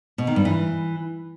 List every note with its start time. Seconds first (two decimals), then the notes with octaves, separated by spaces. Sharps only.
0.18 B2
0.27 D#3
0.36 G2
0.45 E3